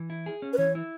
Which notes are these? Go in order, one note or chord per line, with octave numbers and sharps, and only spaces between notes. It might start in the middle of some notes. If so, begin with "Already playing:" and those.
Already playing: E3
E4
G#4
C#4
B4
E3 C#5
E4